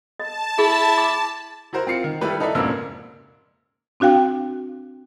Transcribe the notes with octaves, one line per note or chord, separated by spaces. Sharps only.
D#5 A5
E4 G#4
D6
E4 F#4 A#4 C5
C4 F4 C7 C#7
D#3
G3 A3 E4 G4 B4
D#4 A4 B4 D5 E5
E1 F2 G#2 C#3 A#3 E6
C4 D4 F#4 F5 G5